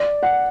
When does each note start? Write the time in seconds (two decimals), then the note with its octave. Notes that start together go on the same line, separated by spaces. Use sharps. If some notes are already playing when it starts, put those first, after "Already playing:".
Already playing: D5
0.23 F#5